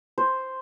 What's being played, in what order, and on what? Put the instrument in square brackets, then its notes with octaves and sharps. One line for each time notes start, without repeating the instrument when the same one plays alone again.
[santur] C5